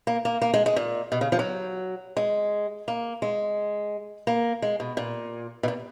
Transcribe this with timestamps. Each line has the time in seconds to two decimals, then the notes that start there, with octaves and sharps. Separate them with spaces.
0.07 A#3
0.25 A#3
0.42 A#3
0.54 G#3
0.66 G#3
0.76 A#2
1.12 B2
1.21 C#3
1.32 F3
1.39 F#3
2.17 G#3
2.88 A#3
3.22 G#3
4.27 A#3
4.62 G#3
4.80 B2
4.97 A#2
5.63 B2
5.68 A#2